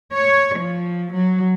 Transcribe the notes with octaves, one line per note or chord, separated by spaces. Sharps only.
C#5
F3
F#3